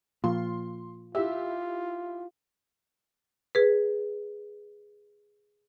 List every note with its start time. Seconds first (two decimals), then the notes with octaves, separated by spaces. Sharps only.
0.24 A#2 F3 F4 C6
1.15 E4 F4 G4 E5
3.55 G#4 B4